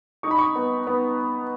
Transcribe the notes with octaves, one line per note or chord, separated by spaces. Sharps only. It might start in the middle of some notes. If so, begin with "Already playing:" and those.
D#4 C#6
B5
C#6
B3
B3